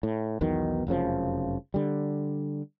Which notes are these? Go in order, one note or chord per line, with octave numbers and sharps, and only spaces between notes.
A2
B1 E2 B2 D#3
F1 F#2 C#3 F3
D3 G3